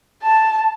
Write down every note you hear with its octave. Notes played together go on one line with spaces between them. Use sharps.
A5